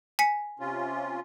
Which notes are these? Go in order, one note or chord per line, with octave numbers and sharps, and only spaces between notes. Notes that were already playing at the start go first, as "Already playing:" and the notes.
G#5 B6 C#7
C3 C#4 F4